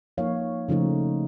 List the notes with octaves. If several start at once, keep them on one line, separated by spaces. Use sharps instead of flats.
F3 A#3 D#4 C#5 F5
C#3 F3 A3 D#4